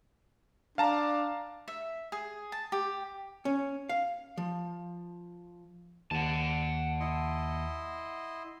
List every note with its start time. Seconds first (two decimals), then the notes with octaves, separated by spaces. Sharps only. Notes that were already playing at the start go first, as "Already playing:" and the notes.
0.78 D4 F5 A5 A#5
1.68 E5
2.12 G#4
2.52 A5
2.72 G4
3.45 C#4
3.89 F5
4.37 F3
6.11 D#2 F#5 A5
7.00 E4 D#5 C6